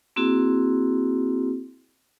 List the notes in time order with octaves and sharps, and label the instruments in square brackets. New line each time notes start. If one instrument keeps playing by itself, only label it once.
[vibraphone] A#3 C4 E4 F#4 G#4